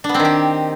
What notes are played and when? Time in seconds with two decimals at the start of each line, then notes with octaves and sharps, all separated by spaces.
0.04 D4
0.09 B3
0.14 C4
0.20 D#3
0.25 G4